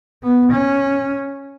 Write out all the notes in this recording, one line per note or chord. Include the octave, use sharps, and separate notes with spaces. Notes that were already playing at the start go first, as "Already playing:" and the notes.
B3
C#4